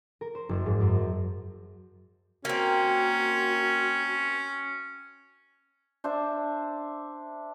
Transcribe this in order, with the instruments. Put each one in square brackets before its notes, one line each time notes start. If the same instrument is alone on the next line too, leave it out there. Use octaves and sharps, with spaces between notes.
[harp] A#4
C5
F#1
G#2
F#2
F#3
[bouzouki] A#3 C4 [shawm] C#4 [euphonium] F#4
[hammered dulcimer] D4 C5 E5